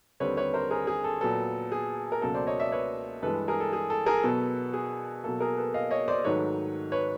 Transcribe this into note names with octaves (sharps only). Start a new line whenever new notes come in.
D#2 D3 G3 C4 B4 C#5
B4 C#5
A#4 C5
G#4 A#4
G#4
A4
A#2 F#3 B3 A4
G#4
A#4
C#2 B2 F#3 A#3 A4
C5 D5
C#5 D#5
D5 E5
B4 C#5
G2 E3 G#3 A4 B4
G#4 A#4
A4
G#4
A4
G#4 A#4
B2 F#3 B3 A4
G#4
B2 F#3 A#3 A4
G#4 A#4
A4 B4
D#5 F5
C#5 D#5
C5 D5
G#2 D#3 F#3 A3 B4 C#5
B4 C#5